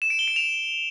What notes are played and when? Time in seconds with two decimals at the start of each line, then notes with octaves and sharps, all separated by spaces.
0.02 E7
0.10 D7
0.19 G7
0.28 D7
0.36 F7